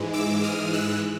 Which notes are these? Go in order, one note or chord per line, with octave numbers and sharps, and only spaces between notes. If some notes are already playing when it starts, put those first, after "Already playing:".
Already playing: G#2 E3 G#3
D6 E6
D#6 F6
E6 F#6